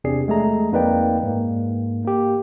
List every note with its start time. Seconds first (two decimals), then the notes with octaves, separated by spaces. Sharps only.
0.04 E2 C3 D4 G#4 D5 C7
0.27 E2 G#3 A3 G#4 A#5
0.72 F2 A#3 D#4 B4 D5 G5
1.23 G#2 A#3
2.05 A#3 G4